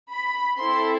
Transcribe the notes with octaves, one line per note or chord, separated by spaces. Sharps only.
B5
C4 E4 A4 C6